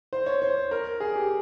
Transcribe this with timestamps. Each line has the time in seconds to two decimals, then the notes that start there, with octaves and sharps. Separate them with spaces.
0.13 C5
0.26 C#5
0.42 C5
0.71 A#4
1.00 G#4
1.16 G4